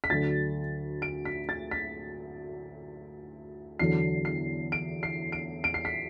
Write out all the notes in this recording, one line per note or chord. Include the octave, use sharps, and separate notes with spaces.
B6
D2 D3 F#3 A6
D7
B6
A6
B6
E2 D3 F#3 C7
C7
D7
C7
D7
D7
C7
B6